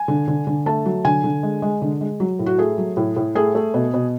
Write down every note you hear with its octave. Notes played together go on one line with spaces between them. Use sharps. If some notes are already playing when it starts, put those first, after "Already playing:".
Already playing: G#5
D3
D3
D3
A3 A5
F#3
D3 G#5
D3
G#3
G#3
D3
G#3
F#3
A2
F#4
A3 G#4
F#3
A2
A2
A3 G#4
A3
B2
B2